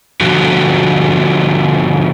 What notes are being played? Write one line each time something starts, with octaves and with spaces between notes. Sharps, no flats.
B2 D3 F3 F#4